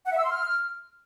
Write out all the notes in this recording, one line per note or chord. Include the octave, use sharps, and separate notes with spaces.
F#5
E5
E6
C6
F6